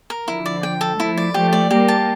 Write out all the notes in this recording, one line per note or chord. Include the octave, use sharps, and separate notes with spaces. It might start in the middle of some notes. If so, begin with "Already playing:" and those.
A#4
D3 F3 E4
D5
G5
A4
F3 A3 E4
D5
F3 A3 G4
D5
G3 A#3 G4
A5